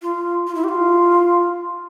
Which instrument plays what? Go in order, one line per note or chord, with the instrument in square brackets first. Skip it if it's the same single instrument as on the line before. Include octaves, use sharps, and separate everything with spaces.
[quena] F4
F4
E4
G4
F4